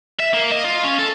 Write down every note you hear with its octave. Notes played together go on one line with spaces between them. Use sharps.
E5
A#3
D#5
F4
C#4
A4